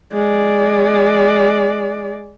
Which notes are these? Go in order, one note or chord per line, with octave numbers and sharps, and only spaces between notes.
G#3 D5